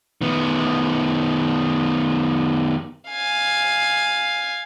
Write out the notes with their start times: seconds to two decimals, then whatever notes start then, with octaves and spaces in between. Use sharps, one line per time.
0.21 D#3 B3
3.11 F5 G#5